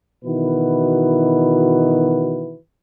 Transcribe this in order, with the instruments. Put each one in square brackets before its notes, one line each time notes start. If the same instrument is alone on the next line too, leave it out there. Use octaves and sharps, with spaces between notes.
[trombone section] B2 D#3 E3 E4 F#4 B4